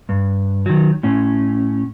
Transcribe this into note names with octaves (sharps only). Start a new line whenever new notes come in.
G2
D#3 F#3
A2 C#4